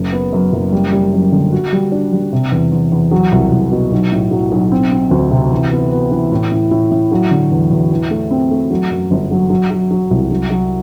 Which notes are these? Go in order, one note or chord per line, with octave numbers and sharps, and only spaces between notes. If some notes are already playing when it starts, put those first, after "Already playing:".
Already playing: F#1
B3
F#2
F#1
G3
G3
F#2
D3
F#4
G3
D4
G3
C3
E2
E2
E2
F#3
C2
C2
B2
B1
A2
F#3
B1
C4
C4
D2
C3
E3
B3
B3
E3
A2
A2
A2
A2
F#3
D3
E2
E2
E3
A3
C4
A3
F#3
F#2
G1
F#3
F#3
F#3
F#3
C2
F#3
F#3